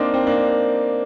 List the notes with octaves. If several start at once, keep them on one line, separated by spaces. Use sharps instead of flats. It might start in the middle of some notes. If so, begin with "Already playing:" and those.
Already playing: A#3 C4 D4 D#4
C4
A#3 D4